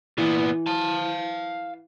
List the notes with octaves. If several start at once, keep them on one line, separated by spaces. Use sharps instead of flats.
A#2 E3 B3
F5 A5